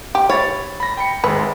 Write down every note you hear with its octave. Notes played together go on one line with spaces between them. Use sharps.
G4
C#5 B5 A6
B5 A#6
G5 B5 C#7
G#1 G#3 B4